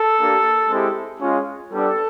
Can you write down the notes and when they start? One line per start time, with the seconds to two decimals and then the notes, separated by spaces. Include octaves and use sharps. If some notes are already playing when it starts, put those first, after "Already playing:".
Already playing: A4
0.20 A#3 D4 G4
0.70 G#3 C4 E4 G4
1.20 G#3 C#4 F4
1.71 G3 B3 D4 A4